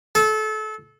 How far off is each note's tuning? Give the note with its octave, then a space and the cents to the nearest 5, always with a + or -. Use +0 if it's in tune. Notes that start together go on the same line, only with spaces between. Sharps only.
A4 -30